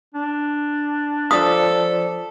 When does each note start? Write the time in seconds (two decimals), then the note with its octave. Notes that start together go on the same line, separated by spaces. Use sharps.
0.14 D4
1.31 F3 A4 D5 D#6 B6